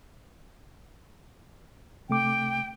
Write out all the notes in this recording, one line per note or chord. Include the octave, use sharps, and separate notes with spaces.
C3 A3 G5 D6